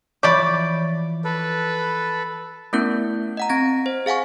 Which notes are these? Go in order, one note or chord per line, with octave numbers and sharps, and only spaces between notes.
E3 F3 C#5 D5 B5 C#6 D6
A4 B4
A3 B3 C#4 E4 A#4 G6
D#5 F#5 A#5
C4 G#6 A#6
C5
G#4 F5 F#5 G#5 C#6